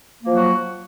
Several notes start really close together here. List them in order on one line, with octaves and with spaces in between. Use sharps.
A#3 F3 F#3 F#4